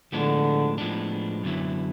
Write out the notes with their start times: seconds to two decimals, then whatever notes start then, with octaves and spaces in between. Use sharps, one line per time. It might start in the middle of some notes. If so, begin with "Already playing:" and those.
0.12 A2 D3 F3 G#3 B3 D4
0.78 A2 F3 G#3 B3 D4
1.43 F#2 D3 F#3 B3 E4